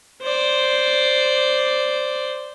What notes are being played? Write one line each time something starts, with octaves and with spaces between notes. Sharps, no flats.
C5 D5